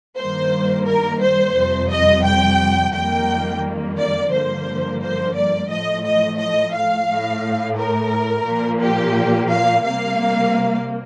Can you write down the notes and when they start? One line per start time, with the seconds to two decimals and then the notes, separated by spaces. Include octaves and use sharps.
0.18 G2 D#3 G3 A#3 C5
0.86 A#4
1.22 C5
1.56 F2 C3 G3
1.91 D#5
2.25 G5
2.93 F2 D#3 G3 A#3 G5
3.98 D5
4.32 G2 D3 F3 A#3 C5
5.01 C5
5.35 D5
5.70 A2 F3 A3 D#5
6.05 D#5
6.39 D#5
6.74 F5
7.07 A2 A3
7.77 A#4
8.45 A#2 F3 A#3
8.80 G4
9.50 F5
9.84 C3 G3 A#3 F5